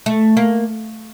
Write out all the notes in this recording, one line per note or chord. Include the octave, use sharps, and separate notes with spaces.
A3
A#3